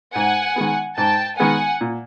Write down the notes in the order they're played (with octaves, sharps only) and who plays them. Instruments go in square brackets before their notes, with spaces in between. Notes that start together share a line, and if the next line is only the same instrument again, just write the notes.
[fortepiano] G#2 [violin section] F#5 G#5
[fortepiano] D#3 G#3 B3
[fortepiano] G#2 [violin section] G5 A5
[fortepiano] D#3 G#3 B3 [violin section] F#5 G#5
[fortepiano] A#2